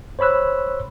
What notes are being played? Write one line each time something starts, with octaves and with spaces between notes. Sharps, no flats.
C5 C#5 B5 E6 F#6